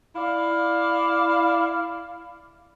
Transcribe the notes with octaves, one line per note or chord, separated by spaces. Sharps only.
E4 D5 F5